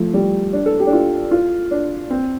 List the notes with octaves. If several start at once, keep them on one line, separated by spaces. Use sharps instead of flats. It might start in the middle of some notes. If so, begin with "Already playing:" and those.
Already playing: F3 A3
G3
D4
A4
G4
D4
F4
F4
D4
C4